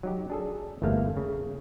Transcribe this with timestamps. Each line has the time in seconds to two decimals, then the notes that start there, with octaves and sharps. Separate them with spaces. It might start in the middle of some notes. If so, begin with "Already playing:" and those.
0.03 F#3 D#4 G4
0.30 D4 G#4 A4
0.82 G1 E2 A3 A#3 F5
1.17 C#3